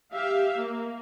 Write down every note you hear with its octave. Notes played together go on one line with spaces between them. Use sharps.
G4 E5 F5
A#3